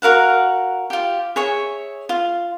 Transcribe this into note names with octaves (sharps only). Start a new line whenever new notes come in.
F#4 A#4 F5 F#5
F4 G4
G#4 C#5 E5
F4